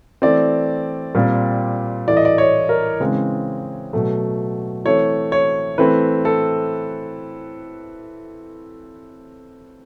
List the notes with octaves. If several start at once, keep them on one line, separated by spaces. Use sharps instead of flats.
E3 A3 C4 D5
A#2 G3 C4
A2 E3 A3 D5
D#5
D5
C#5
A#4
C#3 E3 G#3 C4
B2 F#3 A3
E3 A3 C4 C#5
C#5
E3 A3 C4 B4
A4